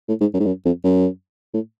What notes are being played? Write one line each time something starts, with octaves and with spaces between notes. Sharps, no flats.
A2
G#2
F#2
G#2
F#2
F2
F#2
A2